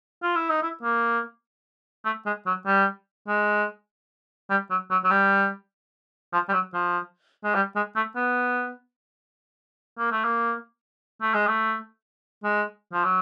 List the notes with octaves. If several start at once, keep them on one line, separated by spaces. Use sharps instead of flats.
F4
E4
D#4
E4
A#3
A3
G#3
F#3
G3
G#3
G3
F#3
F#3
F#3
G3
F3
G3
F#3
F3
G#3
G3
G#3
A3
B3
A#3
A3
A#3
A3
G#3
A3
G#3
F3
F#3